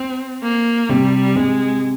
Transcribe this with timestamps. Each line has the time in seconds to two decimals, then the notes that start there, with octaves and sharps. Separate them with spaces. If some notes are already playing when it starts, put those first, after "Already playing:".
Already playing: C4
0.43 A#3
0.89 C3 G3
1.35 C3 G#3